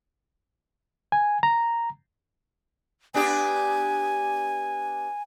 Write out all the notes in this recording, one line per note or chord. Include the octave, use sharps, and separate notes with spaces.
G#5
A#5
B3 D4 G4 G#5